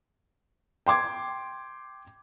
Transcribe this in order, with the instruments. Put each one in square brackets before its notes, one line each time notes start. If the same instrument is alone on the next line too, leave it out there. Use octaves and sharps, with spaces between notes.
[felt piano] G5 C6 D6 G#6